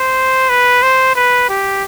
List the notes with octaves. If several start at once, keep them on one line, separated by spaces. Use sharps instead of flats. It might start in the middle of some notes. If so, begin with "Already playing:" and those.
Already playing: C5
B4
C5
B4
G4